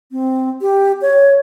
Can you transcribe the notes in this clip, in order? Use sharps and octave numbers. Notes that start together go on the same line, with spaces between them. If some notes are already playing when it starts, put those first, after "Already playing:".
C4
G4
C#5